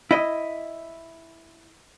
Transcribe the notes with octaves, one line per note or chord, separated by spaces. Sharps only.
E4 D#5